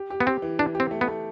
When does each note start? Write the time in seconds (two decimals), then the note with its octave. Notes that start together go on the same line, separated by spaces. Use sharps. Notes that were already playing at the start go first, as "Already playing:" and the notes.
Already playing: G4
0.10 G4
0.20 B3
0.26 C4 G4
0.42 E3
0.59 E3 D4
0.75 G4
0.80 C4
0.91 A3
1.01 B3
1.07 A3